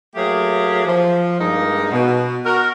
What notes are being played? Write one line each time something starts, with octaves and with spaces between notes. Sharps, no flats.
F#3 A3 A#3 G4 G#4
F3
G2 G#3 A#3 D#4
B2
F#4 A#4